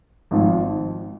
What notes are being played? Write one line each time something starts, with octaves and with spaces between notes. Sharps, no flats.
G#1 G#2 F3